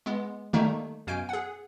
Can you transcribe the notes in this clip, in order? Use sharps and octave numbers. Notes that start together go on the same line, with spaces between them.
G#3 B3
D#3 G3 A3 A#3 D#4
F#2 B2 F5 G#5 G6 D7
G#4 F#5